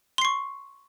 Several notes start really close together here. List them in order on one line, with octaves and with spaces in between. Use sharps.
C6 C7 C#6